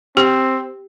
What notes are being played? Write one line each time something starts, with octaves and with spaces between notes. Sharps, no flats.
C4 G4